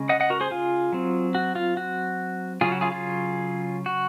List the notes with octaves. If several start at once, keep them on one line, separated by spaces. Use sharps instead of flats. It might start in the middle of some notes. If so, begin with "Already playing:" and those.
Already playing: C#3 G#3 C#4
D#5 F#5
D#5 F#5
F#4 A#4
G#4 C5
F4 G#4
F#3 C4
F#4
F4
F#4
C#3 F#3 C#4 F4 G#4
F#4
F4 G#4
F4 G#4
F#4